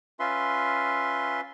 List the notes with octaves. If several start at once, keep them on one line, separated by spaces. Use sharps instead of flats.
C#4 F4 B4 E5 C6